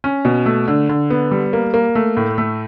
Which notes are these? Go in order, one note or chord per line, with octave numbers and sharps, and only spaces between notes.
C#4
B2
A3
D3
D3
B3
G3
A#3
A#3
A3
A2
A3